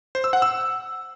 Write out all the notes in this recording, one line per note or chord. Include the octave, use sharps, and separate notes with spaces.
C5
E6
F#5
E6